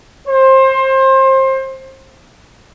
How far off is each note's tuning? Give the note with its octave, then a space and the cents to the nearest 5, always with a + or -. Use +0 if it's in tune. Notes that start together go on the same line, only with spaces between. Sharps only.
C5 +25